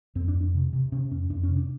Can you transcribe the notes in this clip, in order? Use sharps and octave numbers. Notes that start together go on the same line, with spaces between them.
F2 C4
D4
F2
D4
C3
C3
C3 C#4
F2 C#4
F2 D4
C#4
C3
D4